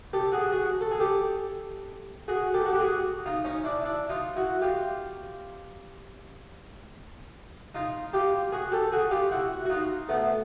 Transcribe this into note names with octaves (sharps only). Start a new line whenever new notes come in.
G4 A4
F#4 G#4
F#4 G#4
A4
G#4
G4 A4
F#4 G#4
G4 A4
F#4
G4
F#4 G#4
D#4 F4
C#4 D#4
D4 E4
D4 E4
D#4 F4
E4 F#4
F4 G4
D#4 F4
F4 G4
F#4 G#4
G4 A4
F#4 G#4
F4 G4
E4 F#4
F#4
D#4 F4
A3 B3